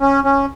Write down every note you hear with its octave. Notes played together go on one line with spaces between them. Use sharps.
C#4
C#4